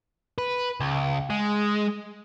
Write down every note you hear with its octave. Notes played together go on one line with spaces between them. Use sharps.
B4
C#2
G#3